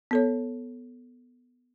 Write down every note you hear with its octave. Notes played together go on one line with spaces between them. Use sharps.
B3 A4 C#5